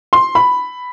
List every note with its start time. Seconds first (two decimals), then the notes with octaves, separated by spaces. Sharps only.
0.13 C6
0.35 B5